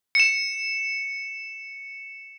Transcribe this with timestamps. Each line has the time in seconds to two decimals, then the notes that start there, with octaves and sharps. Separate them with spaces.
0.15 C#7 E7